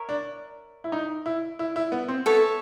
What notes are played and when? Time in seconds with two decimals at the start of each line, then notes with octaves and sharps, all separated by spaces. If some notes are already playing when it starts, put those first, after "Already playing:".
Already playing: A#4 C#5 E5
0.09 D4
0.84 E4
0.92 D#4
1.26 E4
1.59 E4
1.76 E4
1.92 B3
2.08 C4
2.26 B3 A4 C#5 E5